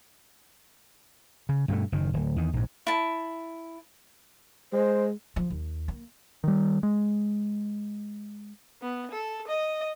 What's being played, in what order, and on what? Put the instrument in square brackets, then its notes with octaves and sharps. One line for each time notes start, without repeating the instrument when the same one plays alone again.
[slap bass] C#3
G2 B2 D#3 A3
F#1 D#3
D1
E2 D#3
A#1 G#2
[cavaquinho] E4 A5
[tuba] G#3 [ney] C5
[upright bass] F3
D#2
A#3
[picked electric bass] D#3 G3
G#3
[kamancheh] B3
A4
D#5